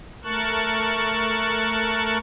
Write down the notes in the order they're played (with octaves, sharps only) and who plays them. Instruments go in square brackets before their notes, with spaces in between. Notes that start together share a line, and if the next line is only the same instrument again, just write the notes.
[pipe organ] A3 A#4 A5 C#6 F#6